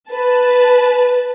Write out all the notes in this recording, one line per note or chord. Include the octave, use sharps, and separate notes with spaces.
B4 A5